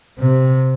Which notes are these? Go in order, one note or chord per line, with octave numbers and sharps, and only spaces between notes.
C3